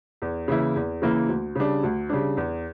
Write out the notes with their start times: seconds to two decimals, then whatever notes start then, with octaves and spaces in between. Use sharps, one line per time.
0.22 E2
0.48 C#3 E3 A#3 E4
0.76 E2
1.02 C#3 E3 A#3 E4
1.29 D2
1.55 C#3 G3 D4
1.83 D2
2.09 C#3 G3 D4
2.37 E2